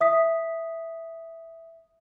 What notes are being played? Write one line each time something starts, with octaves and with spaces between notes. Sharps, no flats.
E5 D#6 B6